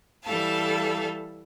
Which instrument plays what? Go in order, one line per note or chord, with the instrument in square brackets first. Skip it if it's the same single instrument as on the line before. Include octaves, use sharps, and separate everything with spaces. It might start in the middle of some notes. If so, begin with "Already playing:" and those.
[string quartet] E3 G3 A4 E5 F5 A5